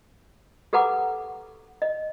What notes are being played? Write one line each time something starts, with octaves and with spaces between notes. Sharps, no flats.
G4 A4 B4 F#5 A#5 D6
D#5